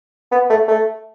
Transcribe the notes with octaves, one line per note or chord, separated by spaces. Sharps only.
B3
A3
A3